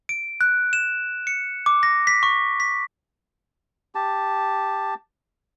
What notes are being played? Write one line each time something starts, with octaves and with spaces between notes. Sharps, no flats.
D7
F#6
E7
C#7
D6
A#6
B6
C#6
B6
G4 A5